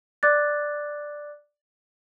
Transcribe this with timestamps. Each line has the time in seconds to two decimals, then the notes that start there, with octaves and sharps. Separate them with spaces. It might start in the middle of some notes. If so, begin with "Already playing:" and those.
0.23 D5 D6 F#6 A6